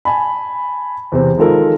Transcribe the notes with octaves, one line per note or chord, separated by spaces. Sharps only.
G#5 A5 B5
E2 C3 C4
D#3 F3 G#3 F4 A4 A#4